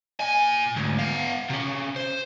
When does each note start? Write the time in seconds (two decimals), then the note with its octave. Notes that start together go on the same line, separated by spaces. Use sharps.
0.21 A#2 G#5
0.76 D2 G#2
0.99 B3 F5
1.50 C3 C#4
1.96 C5